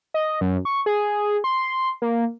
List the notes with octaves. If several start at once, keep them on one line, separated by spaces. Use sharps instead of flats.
D#5
F#2
C#6
G#4
C6
A#3